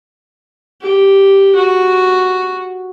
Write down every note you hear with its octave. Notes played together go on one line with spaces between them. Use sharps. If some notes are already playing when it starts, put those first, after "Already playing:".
G4
F#4